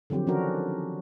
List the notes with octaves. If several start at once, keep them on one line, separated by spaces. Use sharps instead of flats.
D3 F3 F#3 C4 G4
D#3 F3 C#4 D4 F#4 A#4